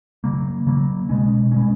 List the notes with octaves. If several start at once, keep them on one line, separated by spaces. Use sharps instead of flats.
C#3 F#3 A#3
C#3 F#3 A#3
B2 G#3 C#4
B2 G#3 C#4